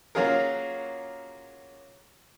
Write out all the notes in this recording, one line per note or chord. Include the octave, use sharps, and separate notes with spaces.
F#3 A#3 C#4 F4 G#4 A#4